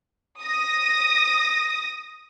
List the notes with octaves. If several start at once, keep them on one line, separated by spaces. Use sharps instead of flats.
D#6 A#6